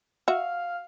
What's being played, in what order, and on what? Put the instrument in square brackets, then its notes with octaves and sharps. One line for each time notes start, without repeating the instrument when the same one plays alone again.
[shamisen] F#4 E5 [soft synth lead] F5